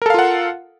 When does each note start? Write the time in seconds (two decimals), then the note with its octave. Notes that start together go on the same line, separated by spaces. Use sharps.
0.02 A#4
0.06 A4
0.10 F5
0.14 F4
0.19 F#5